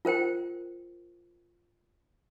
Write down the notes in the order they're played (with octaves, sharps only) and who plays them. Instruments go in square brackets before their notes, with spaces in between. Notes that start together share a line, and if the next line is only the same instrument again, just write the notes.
[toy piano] F4 A#4 C5 G5